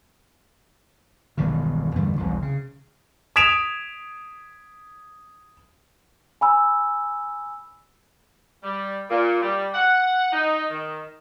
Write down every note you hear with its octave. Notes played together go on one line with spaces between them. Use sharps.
E1 B1 G2 D#3
E2 G2 D3 A3
E1 C2
C#3
D#6 G#6 B6 D7 E7 F7
G#5 B5 E6
G3
A#2
G3
F#5
D#4
D#3